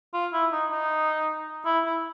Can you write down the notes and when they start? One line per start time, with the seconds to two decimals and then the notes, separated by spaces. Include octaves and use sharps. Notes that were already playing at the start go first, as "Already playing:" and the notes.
0.14 F4
0.33 E4
0.52 D#4
0.71 D#4
1.66 E4
1.86 E4